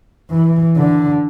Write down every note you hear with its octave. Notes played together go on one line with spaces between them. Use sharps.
E3
D3